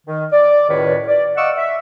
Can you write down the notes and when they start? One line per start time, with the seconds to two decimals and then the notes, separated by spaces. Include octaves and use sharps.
0.07 D#3
0.32 D5
0.69 C#2 F#2 A2 D#3 B4 C#5
1.08 D5
1.36 D#5 F5 F#5 C#6 D6 E6
1.57 E5